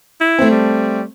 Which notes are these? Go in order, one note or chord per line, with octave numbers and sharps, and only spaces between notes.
E4
A3 C4
G3